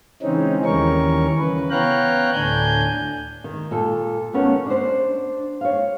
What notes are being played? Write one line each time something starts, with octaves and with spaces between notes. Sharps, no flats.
C#3 E3 G#3 C4 C#4 D#4
D#2 E3 G3 C#4 A#4 C#6
C#3 E3 B4
B3 C#5 F5 G5 A#5 F#6
D2 A2 D4 G#5 G6
D#3
A#2 A4
D#2 A3 B3 C#4 A#4 F#5
D4 C5
C#5 F5